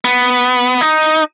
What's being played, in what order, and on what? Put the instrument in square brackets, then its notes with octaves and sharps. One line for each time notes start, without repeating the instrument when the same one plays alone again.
[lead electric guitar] B3
D#4